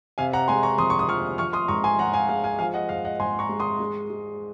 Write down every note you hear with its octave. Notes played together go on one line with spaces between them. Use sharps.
C3 F5 G#5
F#5 A#5
G#3 G#5 C6
A#5 C#6
F2 C6 D#6
C#6
D#6
F3 C#6 F6
F3 C#6 F6
C6 D#6
G#2 A#5 C#6
G#5 C6
G#2 F#5 A#5
F5 G#5
G#3 F5
F5 G#5
F3 F5 G#5
D#5 F#5
G#2 F5
D#5 F#5
G#2 G#5 C6
A#5 C#6
G#3
C6 D#6
G#3
G#3